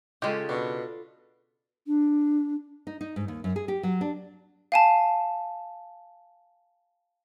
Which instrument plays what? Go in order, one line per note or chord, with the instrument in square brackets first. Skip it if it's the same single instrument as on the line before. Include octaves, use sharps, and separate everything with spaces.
[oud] C#3 [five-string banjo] G#3 G4 [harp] F4 A4
[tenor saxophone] B2 [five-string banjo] D4 [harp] B5
[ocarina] D4
[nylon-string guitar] D#4
D#4
G#2
D#2
F#2
G#4
G4
F#3
D4
[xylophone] F5 G#5 A5